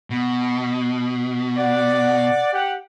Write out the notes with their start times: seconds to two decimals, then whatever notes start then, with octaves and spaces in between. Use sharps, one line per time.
0.10 B2
1.58 D5 F#5
2.53 G4 F#5